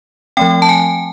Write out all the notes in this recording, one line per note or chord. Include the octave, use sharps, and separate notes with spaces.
F3 A3 C4 G5
A5
G#5